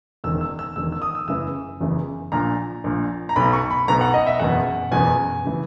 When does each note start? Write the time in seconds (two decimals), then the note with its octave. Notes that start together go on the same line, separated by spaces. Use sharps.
0.24 E1 E2 D#3 E6
0.41 E6
0.59 E6
0.76 E1 E2 D#3 E6
0.92 E6
1.02 D#6
1.15 E6
1.28 F#1 E2 C#3 E3 E6
1.80 F#1 E2 C#3 E3
2.32 A#1 A#2 A#5
2.84 A#1 A#2
3.29 A#5
3.36 B1 B2 B5
3.53 C#6
3.71 B5
3.88 B1 B2 A#5
4.01 F#5
4.14 D#5
4.27 E5
4.39 F#1 E2 B2 F#5
4.91 F#1 E2 B2 G#5
5.45 C#3 E3